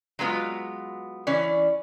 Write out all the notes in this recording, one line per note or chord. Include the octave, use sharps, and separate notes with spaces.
F#3 G#3 B3 F4
E3 C#4 D5